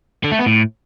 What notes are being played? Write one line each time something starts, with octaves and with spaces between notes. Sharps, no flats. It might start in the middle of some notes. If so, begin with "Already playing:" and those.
D3
A3
B3
A2